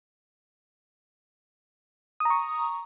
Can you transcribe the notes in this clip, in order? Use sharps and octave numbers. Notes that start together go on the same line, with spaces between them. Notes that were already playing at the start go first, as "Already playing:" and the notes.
A#5 C#6 D#6